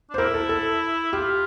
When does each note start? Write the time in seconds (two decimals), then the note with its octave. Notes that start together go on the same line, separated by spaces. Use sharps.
0.10 D4
0.14 C5
0.18 E4 A#4
0.34 A4
0.49 A4
1.13 F4 G4